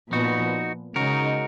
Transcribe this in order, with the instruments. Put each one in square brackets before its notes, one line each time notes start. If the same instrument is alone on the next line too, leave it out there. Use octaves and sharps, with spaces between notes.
[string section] A#2 F3 B3 [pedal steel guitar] D#4 F#4
[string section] C#3 G#3 D#4 [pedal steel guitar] F#4 A#4